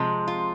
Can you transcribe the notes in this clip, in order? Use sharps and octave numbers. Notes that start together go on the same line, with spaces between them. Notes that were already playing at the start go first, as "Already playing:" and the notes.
Already playing: C3 F3 G#3
F4